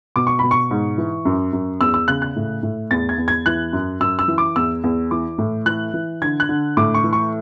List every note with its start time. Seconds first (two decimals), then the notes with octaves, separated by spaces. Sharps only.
0.16 B2 D6
0.27 C#6
0.39 B2 B5
0.51 C#6
0.71 G#2
0.98 E3
1.25 F#2
1.53 F#2
1.81 E2 E6
1.94 E6
2.08 C#3 F#6
2.22 F#6
2.36 A2
2.63 A2
2.91 E2 A6
3.09 G#6
3.18 E2
3.28 G#6
3.46 E3 F#6
3.73 F#2
4.00 F#2 E6
4.19 E6
4.28 E3
4.38 D6
4.56 E2 E6
4.84 E2
5.11 E3 D6
5.38 A2
5.66 E3 F#6
5.94 E3
6.22 D3 G#6
6.40 F#6
6.49 D3
6.77 A2 D6
6.94 C#6
7.04 E3
7.13 C#6